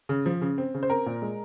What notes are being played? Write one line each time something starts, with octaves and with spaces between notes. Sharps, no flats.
C#3
F3
C#3
C4
C#3
C5
C4 A#4
A#2
G#3